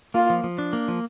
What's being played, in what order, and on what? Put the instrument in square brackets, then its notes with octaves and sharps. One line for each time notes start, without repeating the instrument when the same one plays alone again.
[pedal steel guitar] A#3 [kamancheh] F4
[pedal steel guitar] F3
F3
D4
A#3
F3